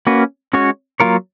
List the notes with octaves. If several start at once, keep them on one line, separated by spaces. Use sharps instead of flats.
A#3 C#4 F#4 B4
G#3 C#4 F#4 C#5
F#3 A#3 F4 A#4 C#5